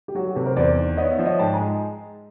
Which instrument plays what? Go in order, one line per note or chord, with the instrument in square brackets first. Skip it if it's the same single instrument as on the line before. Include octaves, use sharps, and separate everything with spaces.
[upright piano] G4
[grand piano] F#3 [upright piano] F#4
[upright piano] G4
[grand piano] C3 [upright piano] A4 B4
[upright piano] A#4 C5
[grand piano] E2 [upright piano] C5 D5
[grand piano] D#3
[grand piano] B3 [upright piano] C#5 D#5
[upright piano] D5 E5
[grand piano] F3
[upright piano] C#5 D#5
[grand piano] G#2 [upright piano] G5 A5
[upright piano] G#5 A#5
[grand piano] G#3